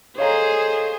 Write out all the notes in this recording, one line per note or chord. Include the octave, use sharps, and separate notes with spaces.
G#4 A4 C5 C#5 D#5 F5 A#5